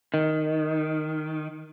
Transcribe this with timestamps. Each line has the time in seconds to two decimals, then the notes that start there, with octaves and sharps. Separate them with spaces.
0.14 D#3